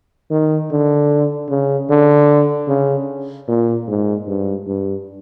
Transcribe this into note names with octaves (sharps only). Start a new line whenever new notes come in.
D#3
D3
C#3
D3
C#3
A#2
G#2
G2
G2